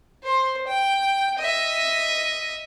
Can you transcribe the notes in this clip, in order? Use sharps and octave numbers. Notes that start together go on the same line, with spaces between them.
C5
G5
D#5 E5